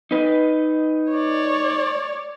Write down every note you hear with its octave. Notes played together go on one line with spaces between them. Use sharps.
D#4 B4 D#5
C#5 D5